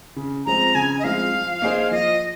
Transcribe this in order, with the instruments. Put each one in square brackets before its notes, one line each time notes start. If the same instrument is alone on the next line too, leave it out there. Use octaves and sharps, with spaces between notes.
[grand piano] C#3
[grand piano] F3 G#3 C4 [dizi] A#5
[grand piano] C#3 [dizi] G#5
[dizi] D#5
[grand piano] F3 G#3 C4 [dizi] F5
[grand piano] F3
A#3 D#4 G#4 C5
[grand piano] F3 [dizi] D#5